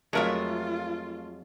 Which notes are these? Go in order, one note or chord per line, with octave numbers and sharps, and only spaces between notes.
F2 F#3 G#3 A3 F4 A#4 E5